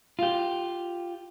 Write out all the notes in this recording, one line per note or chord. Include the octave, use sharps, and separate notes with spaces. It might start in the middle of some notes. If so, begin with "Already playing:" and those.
F4 G4